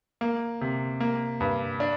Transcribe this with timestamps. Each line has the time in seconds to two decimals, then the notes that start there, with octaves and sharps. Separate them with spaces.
0.21 A#3
0.61 C3
1.00 A#3
1.40 G2
1.80 D4